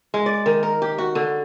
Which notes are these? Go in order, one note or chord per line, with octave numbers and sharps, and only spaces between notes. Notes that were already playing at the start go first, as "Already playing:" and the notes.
G#3
D5
D#3
A#4
G4
F#4
D3